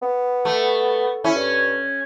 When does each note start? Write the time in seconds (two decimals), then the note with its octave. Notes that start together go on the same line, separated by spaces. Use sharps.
0.03 B3
0.45 A3
1.24 C#4 E4
1.36 G2